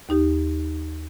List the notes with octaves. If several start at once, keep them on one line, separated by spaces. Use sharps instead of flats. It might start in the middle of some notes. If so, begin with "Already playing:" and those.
D#2 D#4 G4